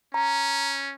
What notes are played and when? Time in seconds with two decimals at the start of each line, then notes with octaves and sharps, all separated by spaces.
0.14 C#4 A#5